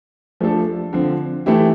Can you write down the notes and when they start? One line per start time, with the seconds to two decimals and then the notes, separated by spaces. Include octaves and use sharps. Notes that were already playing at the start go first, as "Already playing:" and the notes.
0.41 F3 A3 D4 A4
0.93 D3 F3 C4
1.46 E3 A3 E4 G4